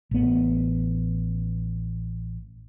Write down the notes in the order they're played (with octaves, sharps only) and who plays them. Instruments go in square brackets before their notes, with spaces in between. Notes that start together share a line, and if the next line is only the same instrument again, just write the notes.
[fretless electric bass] A1 B3